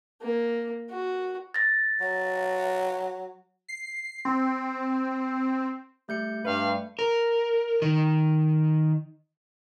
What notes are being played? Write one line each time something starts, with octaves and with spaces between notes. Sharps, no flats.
A#3
F#4
A6 A#6
F#3
C7
C4
G3 A3 G6 C#7
G2 B4 F5
A#4
D#3